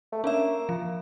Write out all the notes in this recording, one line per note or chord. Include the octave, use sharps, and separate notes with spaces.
A3
A#3 C#4 D4 E5
F3